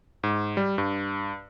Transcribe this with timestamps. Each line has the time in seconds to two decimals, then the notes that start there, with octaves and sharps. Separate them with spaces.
0.23 G#2
0.57 G3
0.78 G2